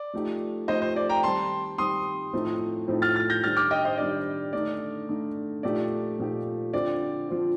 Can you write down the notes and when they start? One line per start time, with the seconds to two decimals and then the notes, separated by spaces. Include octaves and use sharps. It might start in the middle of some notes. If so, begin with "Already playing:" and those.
Already playing: D5
0.13 F3 A3 D#4 G4
0.68 F3 A3 D#4 G4 C5 D#5
0.82 C5
0.96 D5
1.09 G5 A#5
1.23 D#3 G3 C4 A5 C6
1.78 D#3 G3 C4 C6 D#6
2.33 A2 F3 A3 C4 D#4
2.88 A2 F3 A3 C4 D#4
3.02 F6 A6
3.16 F6 A6
3.30 G6 A#6
3.43 D#3 G3 D4 G4 F6 A6
3.57 D6 F6
3.71 D#5 G5
3.85 C5 D#5
3.98 D#3 G3 D4 G4 D5
4.53 D3 A3 D#4 D5
5.08 D3 A3 D#4
5.63 A#2 F3 A3 D#4 G4 D5
6.19 A#2 F3 A3 D#4 G4
6.73 D3 F3 C4 F4 D5
7.29 D3 F3 C4 F4